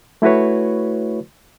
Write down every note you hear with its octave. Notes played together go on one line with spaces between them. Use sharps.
A3 E4 F#4 B4 C#5